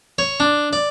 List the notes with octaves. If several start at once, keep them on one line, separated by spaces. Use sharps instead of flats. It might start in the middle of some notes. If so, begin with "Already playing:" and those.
C#5
D4
D5